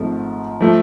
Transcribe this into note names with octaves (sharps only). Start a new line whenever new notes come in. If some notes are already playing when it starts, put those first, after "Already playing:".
Already playing: G#1 G#2 F3 A3 F4
F3 A3